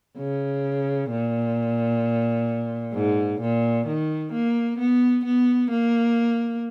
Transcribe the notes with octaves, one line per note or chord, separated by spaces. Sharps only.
C#3
A#2
G#2
A#2
D#3
A#3
B3
B3
A#3